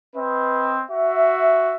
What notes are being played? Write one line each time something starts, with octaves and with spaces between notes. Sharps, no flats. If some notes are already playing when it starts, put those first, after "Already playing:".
C4 B4 D#5
F#4 E5